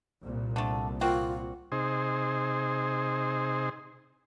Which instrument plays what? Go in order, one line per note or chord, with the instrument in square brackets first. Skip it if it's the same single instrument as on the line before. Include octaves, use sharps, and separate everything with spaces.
[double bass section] C2 A#2
[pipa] D3 A3
[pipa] A#3 C4 F#4 [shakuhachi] F4
[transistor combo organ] C3 D#4 G#4 C5